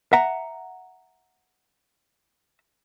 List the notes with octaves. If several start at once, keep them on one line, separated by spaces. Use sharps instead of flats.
E5 F#5 A#5